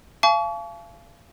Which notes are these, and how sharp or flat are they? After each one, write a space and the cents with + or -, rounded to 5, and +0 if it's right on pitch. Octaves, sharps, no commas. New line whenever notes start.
F5 -35 A5 -45 C#6 +35